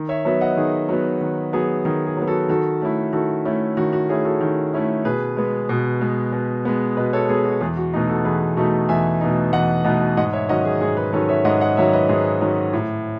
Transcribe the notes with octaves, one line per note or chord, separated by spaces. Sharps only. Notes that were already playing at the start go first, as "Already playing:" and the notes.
Already playing: D#3
C#5 E5
F#3 B3 C#5 E5
D#5 F#5
D#3 G#4
F#3 B3
D#3
F#3 B3 G#4
D#3 G#4
G#4
F#3
B3
F#4 A4
D#3 F#4 A4
A3 C#4 E4
D#3 F#4 A4
A3 C#4 E4
D#3 F#4
F#4
A3 C#4 E4 G#4
F#4 A4
D#3
A3 C#4 E4
B2 G#4 B4
G#3 B3
B2
G#3 B3
B2
G#3 B3
B2 B4 D#5
A4 C#5
G#3 B3 G#4
F#4
E2 G#4
F#4
B2 A3 D#4
F#4 A4
E2 G#4 B4
B2 A3 D#4 F#4 A4
E2 E5 G#5
B2 A3 D#4
E2 D#5 F#5
B2 A3 D#4 D#5 F#5
G#2 D#5 F#5
C#5 E5
D#3 F#3 C#4 D#5 F#5
G#4
G#2 G#4
G#4 B4
D#3 F#3 C#4 A4 C#5
C#5 E5
G#2 D#5 F#5
D#5 F#5
D#3 F#3 C#4 C#5 E5
B4 D#5
G#2 G#4 B4
D#3 F#3 C#4
A2